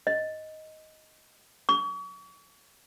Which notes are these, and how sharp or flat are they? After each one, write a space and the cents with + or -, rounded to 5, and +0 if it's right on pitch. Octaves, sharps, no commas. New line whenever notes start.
D#5 +5
C#6 +40